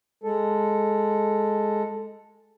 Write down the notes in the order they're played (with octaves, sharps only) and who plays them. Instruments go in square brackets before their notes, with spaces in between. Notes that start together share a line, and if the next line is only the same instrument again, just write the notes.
[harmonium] G#3 A4